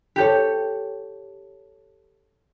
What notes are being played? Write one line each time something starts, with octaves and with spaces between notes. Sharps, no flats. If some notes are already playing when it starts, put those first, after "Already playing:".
G4 A4 C#5